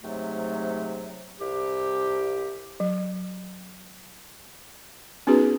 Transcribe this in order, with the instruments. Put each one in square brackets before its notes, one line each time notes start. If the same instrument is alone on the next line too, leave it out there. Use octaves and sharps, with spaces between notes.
[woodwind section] G#2 C3 F#3 A3
C2 G4
[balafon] F#3
B3 C#4 D#4 F#4 G#4 B4